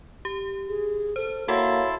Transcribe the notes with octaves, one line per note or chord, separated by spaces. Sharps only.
G4
G#4
A4 C5
A#3 E4 F#4 A4 C#5 F#5 A5 C6